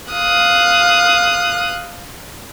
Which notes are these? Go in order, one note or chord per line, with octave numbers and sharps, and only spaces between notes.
F5 D#6 F#6